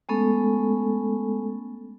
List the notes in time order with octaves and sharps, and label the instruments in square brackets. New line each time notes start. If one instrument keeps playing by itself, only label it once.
[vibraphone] G#3 A3 B3 C#4 A4